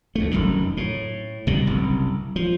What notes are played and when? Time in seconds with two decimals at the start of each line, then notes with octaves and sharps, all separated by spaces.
0.15 D2 A3
0.31 F1 B1 F#2 D#3
0.77 A2
1.47 C2 B2 D3 G3
1.67 F#1 C2
2.36 F3